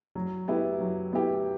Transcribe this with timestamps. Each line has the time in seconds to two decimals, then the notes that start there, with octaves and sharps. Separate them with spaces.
0.15 F#3
0.48 B3 E4 G4
0.80 F#3
1.13 B3 E4 G4